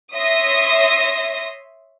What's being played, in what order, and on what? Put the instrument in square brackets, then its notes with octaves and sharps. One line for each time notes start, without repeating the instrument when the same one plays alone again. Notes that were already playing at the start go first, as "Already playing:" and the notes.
[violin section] C#5 E5 C6 D#6 A#6